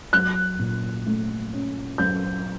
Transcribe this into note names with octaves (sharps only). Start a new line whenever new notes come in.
F#3 F#6
A#2
A3
C#4
F#3 G6